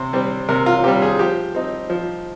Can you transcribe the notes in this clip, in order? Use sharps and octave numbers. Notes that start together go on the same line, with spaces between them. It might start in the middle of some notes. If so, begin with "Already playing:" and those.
Already playing: C3 C5
G3 C4
C3 A#4
F4
G3 C4 G4
G#4
F3 G4
C4 D#4
F3